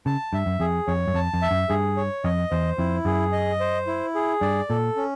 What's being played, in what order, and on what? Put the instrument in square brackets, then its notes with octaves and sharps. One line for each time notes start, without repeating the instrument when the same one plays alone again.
[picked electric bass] C#3 [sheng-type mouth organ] A5
[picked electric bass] G2 [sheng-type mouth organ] E5
[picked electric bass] F#2
[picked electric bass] F2 [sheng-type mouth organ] G#4
[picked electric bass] F2 [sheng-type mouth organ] C#5
[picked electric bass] F#2
[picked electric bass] F2 [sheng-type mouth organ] A5
[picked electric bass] F2
[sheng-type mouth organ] E5
[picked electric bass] F#2
[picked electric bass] G2 [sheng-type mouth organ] G#4
[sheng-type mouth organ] C#5
[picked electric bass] F2 [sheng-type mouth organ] D#5
[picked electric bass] E2 [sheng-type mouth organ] C5
[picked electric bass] F2 [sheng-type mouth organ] E4
[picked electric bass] F#2 [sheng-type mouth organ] G#4
[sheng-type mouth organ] D#5
C5
E4
G#4
[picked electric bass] G2 [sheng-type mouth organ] D5
[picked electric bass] A#2 [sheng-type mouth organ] A4
[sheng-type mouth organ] C#4